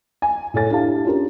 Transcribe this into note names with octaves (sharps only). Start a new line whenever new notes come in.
G#5
A2 A4 C#5 G#5 A6
D4 E4 G4 F5 A5
C#4 D4 F4 G4 A#4